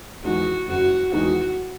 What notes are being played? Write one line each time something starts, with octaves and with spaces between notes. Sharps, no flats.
E2 D#3 G#3 D#4 F#4
F#1 F#4
E2 D#3 G#3 D#4 F#4